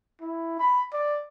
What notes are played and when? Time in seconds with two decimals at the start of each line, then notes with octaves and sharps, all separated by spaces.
0.21 E4
0.59 B5
0.93 D5